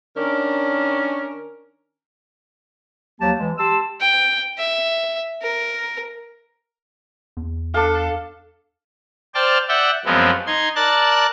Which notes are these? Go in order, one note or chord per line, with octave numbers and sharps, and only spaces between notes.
D#3 C#4 D4 A#4
D#2 F3 F#3 A#3 G4 A5
E3 G#3
G4 A5 C6 E6
G5
E5
A#4
E2
D4 A4 F5
C5 D5 G5 A5 F6
D5 E5 F#5 G5
F#2 F3 G#3 B3 C4
D#4 C6 G#6
A#4 D5 A5 F#6 A6